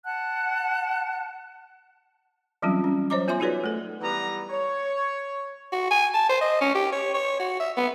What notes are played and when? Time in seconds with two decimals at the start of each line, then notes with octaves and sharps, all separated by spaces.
0.05 F#5 A5 F#6
2.62 E3 F#3 G3 C4 C#4 F4
2.84 C#4
3.10 F#3 C5 C#5 D#5 A#5 D6
3.28 B3 F4 E5 G#5 C6
3.40 D#4 F#4 G#4 B4 C#5 D5
3.64 A3 A4
4.00 E3 G3 B3 F#5 A#5
4.50 C#5
5.72 F#4
5.91 G#5
6.14 A5
6.29 C5
6.41 D#5
6.61 C#4
6.75 G4
6.92 C#5
7.14 C#5
7.39 F#4
7.60 E5
7.77 B3